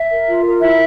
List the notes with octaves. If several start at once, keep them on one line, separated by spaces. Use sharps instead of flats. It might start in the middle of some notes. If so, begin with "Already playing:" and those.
Already playing: E5
A#4
F4
A#4
E4 E5